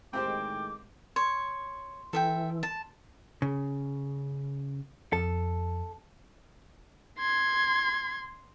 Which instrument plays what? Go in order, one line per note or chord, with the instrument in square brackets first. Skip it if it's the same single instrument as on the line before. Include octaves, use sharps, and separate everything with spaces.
[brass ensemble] A2 D#3 G#3 [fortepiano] C4 G4 C5 [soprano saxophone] G5 [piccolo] D6
[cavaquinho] C#5 [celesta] C6
[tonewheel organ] E3 [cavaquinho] A4 E5 G5
[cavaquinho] A5
[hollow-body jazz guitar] C#3
[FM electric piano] F2 [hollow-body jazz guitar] A4
[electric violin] C6 G#6